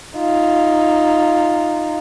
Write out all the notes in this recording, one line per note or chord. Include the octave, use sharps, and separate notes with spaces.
D#4 F4